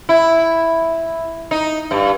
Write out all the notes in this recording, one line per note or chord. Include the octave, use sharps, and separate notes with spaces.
E4
D#4
G2